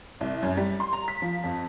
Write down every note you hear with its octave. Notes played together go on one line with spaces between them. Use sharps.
C2
F#2
G3
C6
A#5
B6
F3
F2